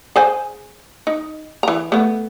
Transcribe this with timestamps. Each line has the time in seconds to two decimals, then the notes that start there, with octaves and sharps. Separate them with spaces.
0.16 G#4 C5 G#5
1.07 D#4
1.63 E3 A#5
1.92 A3 B3